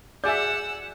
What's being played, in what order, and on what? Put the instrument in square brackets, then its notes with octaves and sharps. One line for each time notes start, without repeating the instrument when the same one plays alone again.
[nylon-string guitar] F#4 G#4 [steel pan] D5 E5 [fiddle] F#5 E6 [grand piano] G#5 G6